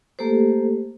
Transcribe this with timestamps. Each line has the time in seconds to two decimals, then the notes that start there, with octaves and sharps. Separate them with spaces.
0.19 A3 A#3 G4 A4 C5